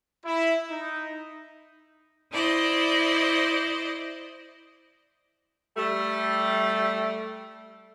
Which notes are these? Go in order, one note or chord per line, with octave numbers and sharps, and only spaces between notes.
E4
D#4
E4 C5 D5 D#5
G3 A3